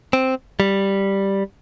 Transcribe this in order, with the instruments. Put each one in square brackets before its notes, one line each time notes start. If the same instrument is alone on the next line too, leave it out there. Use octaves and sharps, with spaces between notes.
[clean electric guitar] C4
G3